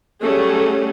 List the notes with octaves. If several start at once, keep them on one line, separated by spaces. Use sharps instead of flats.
F#3 G3 A3 C#4 G#4